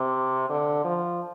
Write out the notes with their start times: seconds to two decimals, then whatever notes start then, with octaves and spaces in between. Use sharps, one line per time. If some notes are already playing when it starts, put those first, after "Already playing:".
Already playing: C3
0.49 D3
0.84 F3